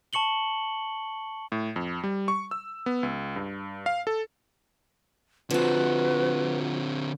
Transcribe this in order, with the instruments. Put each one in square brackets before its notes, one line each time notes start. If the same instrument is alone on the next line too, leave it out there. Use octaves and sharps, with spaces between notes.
[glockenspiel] A5 C#6 C#7 F#7 G7
[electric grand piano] A2
F2
G3
C#6
E6
B3
C#2
G2
F5
A4
[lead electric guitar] D3 C4 [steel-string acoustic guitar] F3 F#4 [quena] B4